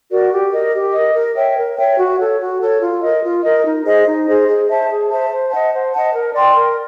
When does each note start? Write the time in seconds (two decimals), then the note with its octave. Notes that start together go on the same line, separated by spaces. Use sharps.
0.10 F#4 A#4 D5
0.31 G4
0.52 A#4 D#5
0.73 G4
0.93 A#4 D#5
1.14 A#4
1.35 C#5 E5 G5
1.56 A#4
1.76 C#5 E5 G5
1.98 F#4
2.18 A4 C#5
2.39 F#4
2.60 A4 C#5
2.81 F4
3.01 A#4 D#5
3.22 F4
3.43 A#4 D#5
3.64 D#4
3.85 G#4 C5 D#5
4.06 D#4
4.27 G#4 C5 D#5
4.47 G#4
4.68 C5 E5 A5
4.89 G#4
5.09 C5 E5 A5
5.31 C5
5.51 D#5 F#5 A5
5.72 C5
5.93 D#5 F#5 A5
6.13 A#4
6.34 D5 G5 C6
6.55 A#4